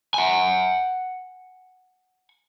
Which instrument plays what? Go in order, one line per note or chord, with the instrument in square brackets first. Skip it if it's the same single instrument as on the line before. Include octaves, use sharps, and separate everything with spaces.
[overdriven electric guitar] F#5 G#5